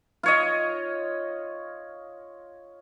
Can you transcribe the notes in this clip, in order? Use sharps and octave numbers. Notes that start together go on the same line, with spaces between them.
F4 C#5 D#5